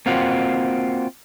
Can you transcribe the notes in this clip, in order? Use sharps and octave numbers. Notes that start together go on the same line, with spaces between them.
A#3 C4 F4 F#4